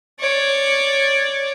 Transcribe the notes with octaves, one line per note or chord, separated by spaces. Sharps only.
C#5 D5